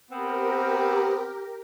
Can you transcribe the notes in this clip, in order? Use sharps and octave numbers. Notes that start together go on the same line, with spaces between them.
B3 C4 G4 A#4